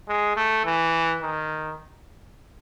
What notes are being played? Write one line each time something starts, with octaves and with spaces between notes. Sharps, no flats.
G#3
A3
E3
D#3